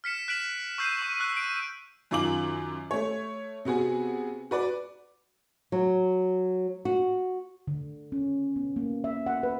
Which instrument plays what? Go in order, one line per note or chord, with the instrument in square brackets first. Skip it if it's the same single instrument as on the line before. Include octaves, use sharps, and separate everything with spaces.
[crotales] F6 B6 C#7 E7
F#6 B6 D7 E7 F#7
C#6 E6 G6 C7 D#7
C#6
E6 F#6
D7
[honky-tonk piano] F#2 D#3 F4 D6 F#7
A3 C#5
C3 B3 F#4 G#4
F#4 B4 D5
[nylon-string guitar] F#3
F#4
[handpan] D3
C#4
B3
A#3
E5
F#5
B4